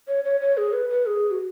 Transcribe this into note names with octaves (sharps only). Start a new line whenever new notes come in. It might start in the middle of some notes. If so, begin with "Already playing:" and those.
C#5
C#5
C#5
G#4
B4
B4
G#4
F#4